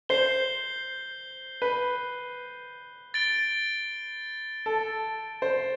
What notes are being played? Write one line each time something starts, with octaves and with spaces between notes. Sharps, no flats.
C5 G6 C7 G7
B4
A6 D7 G7
A4
C5